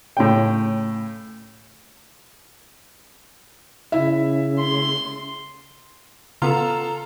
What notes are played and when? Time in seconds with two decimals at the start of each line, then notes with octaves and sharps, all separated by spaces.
0.17 A2 C#3 G5
3.92 C#3 E4 E5
4.59 C6
6.42 C#3 B3 F4 A4 A#5